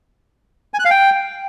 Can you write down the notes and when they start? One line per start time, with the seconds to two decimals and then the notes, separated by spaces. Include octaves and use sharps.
0.74 G#5
0.79 F#6
0.85 F5
0.90 G5